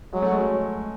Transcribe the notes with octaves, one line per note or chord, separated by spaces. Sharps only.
F#3 G#3
A3
G#3